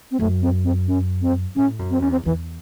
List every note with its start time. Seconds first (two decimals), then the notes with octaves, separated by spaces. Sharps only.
0.11 C4
0.19 F#2 A3
0.42 C4
0.65 C4
0.88 C#4
1.22 C4
1.56 A2 C#4
1.79 F#2
1.91 C4
2.01 E2 C#4
2.11 C4
2.25 E2 E3